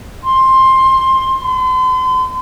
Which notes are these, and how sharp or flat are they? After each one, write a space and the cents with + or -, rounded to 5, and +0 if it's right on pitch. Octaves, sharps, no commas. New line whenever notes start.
C6 +15
C6 -40